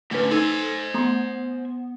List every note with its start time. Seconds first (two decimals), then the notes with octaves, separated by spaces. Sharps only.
0.11 A2 D3 A3 C#4 B4
0.31 D#4 A4 C5 G#5
0.94 A3 B3 A#5 C6